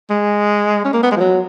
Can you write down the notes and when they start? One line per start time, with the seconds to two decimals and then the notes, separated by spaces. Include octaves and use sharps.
0.10 G#3
0.85 C#4
0.94 A#3
1.03 B3
1.11 G#3
1.16 F3
1.20 F#3